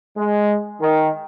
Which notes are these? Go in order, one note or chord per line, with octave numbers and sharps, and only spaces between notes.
G#3
D#3